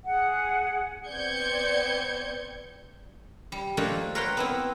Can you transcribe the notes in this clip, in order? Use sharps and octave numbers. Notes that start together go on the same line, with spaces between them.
G#4 F#5
B3 C4 D5 G6 G#6 C#7
G3
F3 A3 A#3 D4 D#4 F4
A#4 B4 C#5 F#5 G5 C6
B3 C4 E4